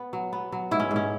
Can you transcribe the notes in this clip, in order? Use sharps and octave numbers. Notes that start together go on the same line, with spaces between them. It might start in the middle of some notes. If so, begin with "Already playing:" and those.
Already playing: B3
F#3
B3
F#3
G#2 E4
C#4
G#2
C#4